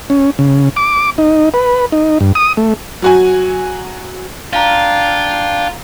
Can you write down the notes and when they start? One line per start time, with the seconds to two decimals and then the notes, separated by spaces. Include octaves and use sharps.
0.10 C#4
0.39 C#3
0.76 D6
1.18 D#4
1.54 B4
1.92 D#4
2.20 G2
2.35 D#6
2.57 A3
3.02 F#3 F#4 G#5
4.53 D4 F4 F5 G5 A#5